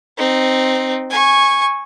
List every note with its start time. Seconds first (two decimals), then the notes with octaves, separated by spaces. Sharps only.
0.18 C4 D#4
1.10 G#5 C#6